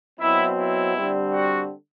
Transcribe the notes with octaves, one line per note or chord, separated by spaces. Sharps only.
B2 F#3 C4 E4
E4
D3 G3 C4
F#4